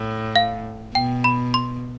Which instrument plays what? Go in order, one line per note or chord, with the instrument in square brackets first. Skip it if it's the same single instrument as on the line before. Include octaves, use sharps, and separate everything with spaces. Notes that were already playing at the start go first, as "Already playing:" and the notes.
Already playing: [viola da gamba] A2
[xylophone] F5
[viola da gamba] B2 [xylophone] G5
[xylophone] B5
C6